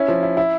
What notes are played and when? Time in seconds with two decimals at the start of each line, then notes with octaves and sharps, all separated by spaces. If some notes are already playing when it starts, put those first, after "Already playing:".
Already playing: C#4 E4
0.08 F3
0.23 E4
0.37 E4